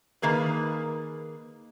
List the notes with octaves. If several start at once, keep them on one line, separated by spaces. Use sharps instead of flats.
D#3 A#3 G#4 B4